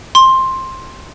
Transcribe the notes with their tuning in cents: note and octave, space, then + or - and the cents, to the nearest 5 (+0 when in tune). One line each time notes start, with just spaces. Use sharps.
C6 +10